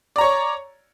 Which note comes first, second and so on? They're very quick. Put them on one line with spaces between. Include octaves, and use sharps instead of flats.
D5 A#5 C#5 C#6